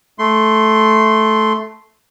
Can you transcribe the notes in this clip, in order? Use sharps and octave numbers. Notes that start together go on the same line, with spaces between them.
A3 C6